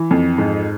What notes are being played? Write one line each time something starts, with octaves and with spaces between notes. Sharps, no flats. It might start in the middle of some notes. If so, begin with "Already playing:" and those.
Already playing: E3
F2
G#2